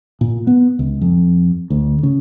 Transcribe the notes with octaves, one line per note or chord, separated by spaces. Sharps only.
A#2
B3
C#2
F2
D2
C#3